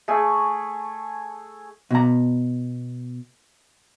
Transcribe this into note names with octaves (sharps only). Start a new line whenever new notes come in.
A3 G#4 G#5
B2 A#5